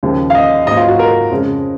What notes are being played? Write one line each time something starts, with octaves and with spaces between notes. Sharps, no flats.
D#2 C#3 F3 G#3
F5
D#5
G#2 F#3 A#3 D#5
F4
F#4
A#4
F2 C#3 G#3